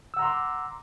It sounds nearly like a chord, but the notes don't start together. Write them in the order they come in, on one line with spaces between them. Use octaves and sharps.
E6 F#5 A#5 C6 D6